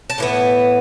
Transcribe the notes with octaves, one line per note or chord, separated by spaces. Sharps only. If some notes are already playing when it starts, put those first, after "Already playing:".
A5
A2 E3 B3